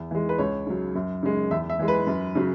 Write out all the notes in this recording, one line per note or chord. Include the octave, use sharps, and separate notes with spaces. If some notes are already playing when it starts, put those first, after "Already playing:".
Already playing: E2
E3 G#3
B4
C#2 C#5
C#3 F#3
F#2
C#3 G#3
E2 E5
E5
E3 G#3
B4
F#2
C#3 F#3